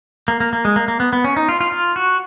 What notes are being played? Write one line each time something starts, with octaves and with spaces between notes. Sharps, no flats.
A#3
A#3
A#3
G#3
A#3
A#3
B3
B3
C#4
D#4
F4
F4
F4
F#4